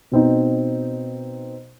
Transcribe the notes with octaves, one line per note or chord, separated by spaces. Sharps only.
B2 C4 D#4